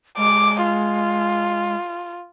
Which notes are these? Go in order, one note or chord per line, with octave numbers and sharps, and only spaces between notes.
G#3 D6
F4